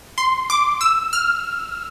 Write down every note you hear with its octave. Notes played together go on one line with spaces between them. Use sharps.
C6
D6
E6
F6